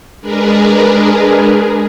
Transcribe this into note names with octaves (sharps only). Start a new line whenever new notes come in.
G#3 D4 G#4 A#4 B4